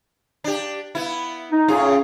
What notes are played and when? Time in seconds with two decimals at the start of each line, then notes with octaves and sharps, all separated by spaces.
0.44 D4 G4
0.95 B3 E4
1.51 D#4
1.68 A2 C#4 F4 G#4